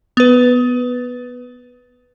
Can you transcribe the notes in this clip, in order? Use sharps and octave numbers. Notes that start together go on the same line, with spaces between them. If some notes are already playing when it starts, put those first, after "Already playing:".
B3 B4